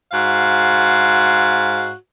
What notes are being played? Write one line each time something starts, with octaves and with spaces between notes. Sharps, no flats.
G#2 F#4 F5